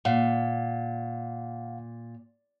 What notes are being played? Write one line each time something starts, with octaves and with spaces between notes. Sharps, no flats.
A#2 F5 F#5